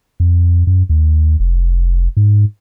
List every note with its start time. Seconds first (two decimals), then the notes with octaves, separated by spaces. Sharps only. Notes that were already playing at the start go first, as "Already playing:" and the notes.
0.20 F2
0.67 F#2
0.89 D#2
1.40 F1
2.17 G#2